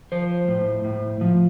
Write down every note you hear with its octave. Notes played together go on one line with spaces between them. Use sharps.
F3 C5
A2
A2
F3